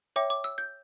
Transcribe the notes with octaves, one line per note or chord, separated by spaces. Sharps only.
C#5 E5 G5 D6
D6
E6
G6